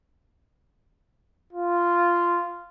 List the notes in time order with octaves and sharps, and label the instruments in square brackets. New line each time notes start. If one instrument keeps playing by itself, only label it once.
[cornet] F4